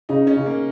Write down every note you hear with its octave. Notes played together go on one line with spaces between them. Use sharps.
C#3 D#4
C#4
C#3
A#3